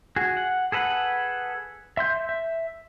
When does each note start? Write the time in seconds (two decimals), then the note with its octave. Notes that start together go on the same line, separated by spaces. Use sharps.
0.16 F#4 G#4
0.37 F#5
0.72 G#4 A4 B4 F#5
1.97 E5 C6 G6
2.29 E5